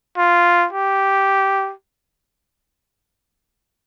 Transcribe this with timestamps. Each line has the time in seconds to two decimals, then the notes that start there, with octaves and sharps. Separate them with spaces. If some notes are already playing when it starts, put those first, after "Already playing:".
0.17 F4
0.73 G4